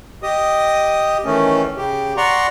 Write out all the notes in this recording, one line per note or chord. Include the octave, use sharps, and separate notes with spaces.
G4 D#5 D#6
D#3 E3 A3 C#4
C#3 G4
D5 F#5 A#5 C6 C#6